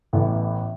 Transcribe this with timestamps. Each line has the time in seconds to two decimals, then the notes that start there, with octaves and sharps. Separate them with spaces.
0.13 A1 A2 E3 B3